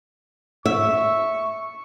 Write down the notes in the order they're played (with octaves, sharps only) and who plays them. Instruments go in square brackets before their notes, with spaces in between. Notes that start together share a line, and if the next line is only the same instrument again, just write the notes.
[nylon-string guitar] E5 [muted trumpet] C#6